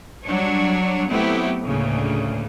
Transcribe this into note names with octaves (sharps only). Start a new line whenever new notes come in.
F#3 G3 D4 C#5
F#3 A3 B3 C4 E4 G4
D2 A2 C#3 A#3